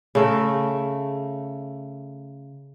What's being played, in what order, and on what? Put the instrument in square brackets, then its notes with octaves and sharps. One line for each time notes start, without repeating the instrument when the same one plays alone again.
[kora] C#3 A3 A#4